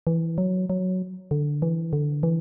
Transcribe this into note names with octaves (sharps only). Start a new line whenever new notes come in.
E3
F#3
F#3
D3
E3
D3
E3